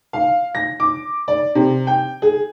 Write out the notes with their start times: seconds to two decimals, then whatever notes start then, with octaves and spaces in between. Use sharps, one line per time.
0.13 F5
0.55 A#6
0.80 D6
1.28 D5
1.55 C3
1.87 G5
2.22 G#4